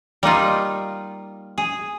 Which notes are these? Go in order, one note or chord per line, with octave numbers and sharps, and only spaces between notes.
G3 A#3 D#4 F4
G#4